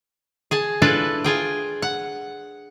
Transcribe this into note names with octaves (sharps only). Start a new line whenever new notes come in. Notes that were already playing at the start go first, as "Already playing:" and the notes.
G#4 G#5 A5
D4 E4 F4 A4 B4 D5
F4 G#4 G5
F#5